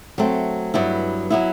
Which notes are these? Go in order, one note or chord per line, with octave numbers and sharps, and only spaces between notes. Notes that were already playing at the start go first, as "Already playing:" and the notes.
F#3 A3 C4
G2 F#3 B3 E4
F#3 B3 E4